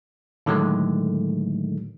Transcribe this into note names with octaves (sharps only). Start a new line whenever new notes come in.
A2 D3 D#3 F#3 G#3 A3